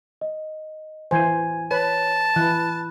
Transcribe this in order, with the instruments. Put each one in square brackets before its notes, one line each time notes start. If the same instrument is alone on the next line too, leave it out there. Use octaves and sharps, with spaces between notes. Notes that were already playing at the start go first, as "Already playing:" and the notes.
[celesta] D#5
[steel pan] E3 C5 [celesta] G#5 G#6 D#7
[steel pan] B4 [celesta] C#5 [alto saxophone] A5
[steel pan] E3 [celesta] B5 F#6